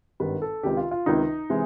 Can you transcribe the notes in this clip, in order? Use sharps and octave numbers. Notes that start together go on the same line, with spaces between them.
G#1 G2 D#3 G3 B4
A4
C#2 C3 D#3 G4
F4
F4
C#2 C3 D#3 D#4
C3 E3 G#3